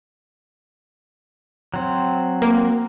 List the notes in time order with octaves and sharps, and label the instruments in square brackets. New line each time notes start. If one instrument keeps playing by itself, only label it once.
[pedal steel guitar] F#3 C4
[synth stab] A#3